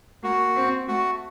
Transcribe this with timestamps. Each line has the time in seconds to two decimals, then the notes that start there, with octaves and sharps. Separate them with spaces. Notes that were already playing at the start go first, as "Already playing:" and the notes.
0.23 A#3 F#4
0.56 C4
0.88 A3 F#4